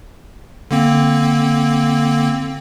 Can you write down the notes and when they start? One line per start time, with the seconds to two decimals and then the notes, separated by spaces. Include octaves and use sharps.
0.71 D3 A#3 C4